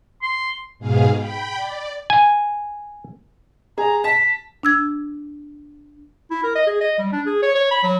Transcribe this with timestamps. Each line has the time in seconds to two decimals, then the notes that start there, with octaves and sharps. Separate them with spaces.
0.23 C6
0.79 G#2 B2 G#4 F5
1.16 G5 B5
1.56 D5
2.10 G#5
3.78 G#4 A#5
4.04 A5 B6
4.63 D4 E6 G#6
6.31 E4
6.44 A#4
6.56 D#5
6.67 G#4
6.81 D#5
6.99 G3
7.13 D4
7.26 G#4
7.43 C#5
7.55 C#5
7.71 B5
7.83 F#3